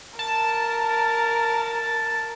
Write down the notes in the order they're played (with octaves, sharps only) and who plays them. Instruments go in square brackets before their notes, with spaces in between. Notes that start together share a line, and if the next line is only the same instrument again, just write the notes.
[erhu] A#4 [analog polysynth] A5